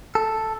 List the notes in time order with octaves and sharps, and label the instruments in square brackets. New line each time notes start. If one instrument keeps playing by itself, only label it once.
[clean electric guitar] A4